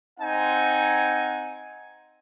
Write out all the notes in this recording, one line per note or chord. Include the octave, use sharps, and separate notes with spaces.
C4 D#4 F#5 G#5